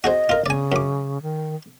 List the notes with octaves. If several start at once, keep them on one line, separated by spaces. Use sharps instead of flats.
F#4 G#4 C5 D#5
F4 A#4
C#3 D5 G#5
F#2 D6
D#3